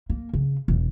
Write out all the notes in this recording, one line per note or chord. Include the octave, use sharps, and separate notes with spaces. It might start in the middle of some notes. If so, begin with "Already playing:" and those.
A#3
C#3
E1